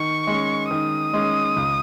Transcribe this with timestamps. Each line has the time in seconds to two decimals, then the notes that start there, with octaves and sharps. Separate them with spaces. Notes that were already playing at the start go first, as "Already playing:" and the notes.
Already playing: D#3 C#6
0.27 G#3 C#4
0.70 D#3 D#6
1.13 G#3 C#4
1.56 C#2